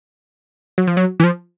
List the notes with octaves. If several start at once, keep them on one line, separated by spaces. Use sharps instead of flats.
F#3
F3
F#3
E3
F3